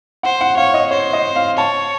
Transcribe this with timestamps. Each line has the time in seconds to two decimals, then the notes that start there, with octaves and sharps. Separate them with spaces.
0.23 C5 F#5
0.41 F#5
0.57 C#5 F5
0.74 D#5
0.91 C5 C#5
1.13 D#5
1.36 F5
1.57 C#5 A5